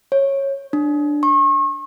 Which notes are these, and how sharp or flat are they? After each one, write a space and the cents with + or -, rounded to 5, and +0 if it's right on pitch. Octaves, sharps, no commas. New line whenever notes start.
C#5 -15
D4 +5
C#6 -40